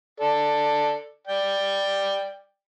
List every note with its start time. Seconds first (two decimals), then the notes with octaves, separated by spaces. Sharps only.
0.20 A4 D5
1.27 D5 G5